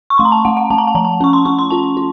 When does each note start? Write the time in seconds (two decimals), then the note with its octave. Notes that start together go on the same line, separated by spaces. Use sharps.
0.10 C#6
0.18 A3 C6
0.25 A#5
0.32 A5
0.45 A3 F#5
0.57 F#5
0.70 A3 A5
0.78 A#5
0.87 A5
0.95 F3 A#5
1.05 A5
1.21 C#4 C#6
1.33 C6
1.45 C#4 C#6
1.59 C6
1.70 F4 A5
1.97 F4